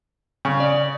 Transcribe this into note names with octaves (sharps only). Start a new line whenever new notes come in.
C#3
D5